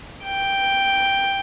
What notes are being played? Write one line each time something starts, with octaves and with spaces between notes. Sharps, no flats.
G5